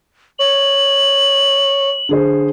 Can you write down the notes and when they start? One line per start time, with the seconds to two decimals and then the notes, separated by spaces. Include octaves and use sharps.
0.39 C#5 F#7
2.09 D3 G#4 C5